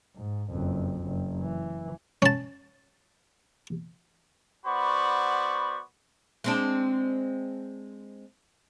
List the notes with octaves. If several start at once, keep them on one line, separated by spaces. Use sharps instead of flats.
G#2
F#1 F2
F#1
E3
C#4 A5
B3 F#4 C5 D5 B5 C#6
G#3 C4 D4